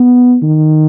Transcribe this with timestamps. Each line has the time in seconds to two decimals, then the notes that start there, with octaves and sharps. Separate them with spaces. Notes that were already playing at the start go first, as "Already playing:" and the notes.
Already playing: B3
0.43 D#3